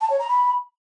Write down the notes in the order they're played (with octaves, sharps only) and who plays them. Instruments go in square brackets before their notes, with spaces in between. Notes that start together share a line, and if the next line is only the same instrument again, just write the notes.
[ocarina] A5
C#5
A#5
B5